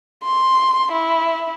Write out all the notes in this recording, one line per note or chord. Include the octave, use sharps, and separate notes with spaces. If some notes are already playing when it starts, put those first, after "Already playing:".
C6
E4